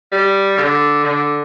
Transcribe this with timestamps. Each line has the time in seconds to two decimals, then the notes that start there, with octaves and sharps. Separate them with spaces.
0.12 G3
0.58 D3
1.04 D3